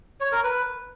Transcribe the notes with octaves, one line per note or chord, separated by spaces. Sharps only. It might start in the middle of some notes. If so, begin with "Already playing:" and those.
C#5
A#4
B4